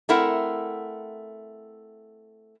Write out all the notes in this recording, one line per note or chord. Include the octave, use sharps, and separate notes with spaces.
A3 C4 E4 A#4 F#5